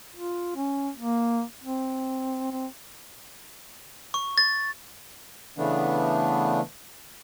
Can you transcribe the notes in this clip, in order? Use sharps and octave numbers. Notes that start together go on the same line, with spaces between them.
F4
C#4
A#3
C4
C4
C#6
A6
C#3 E3 A3 B3 D4